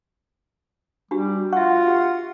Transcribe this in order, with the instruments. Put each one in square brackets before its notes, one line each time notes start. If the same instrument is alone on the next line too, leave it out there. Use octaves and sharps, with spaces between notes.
[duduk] G3 [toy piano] D4 F#4 G4
[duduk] F4 [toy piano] E5 C#6 [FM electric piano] F#5
[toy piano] G4 E5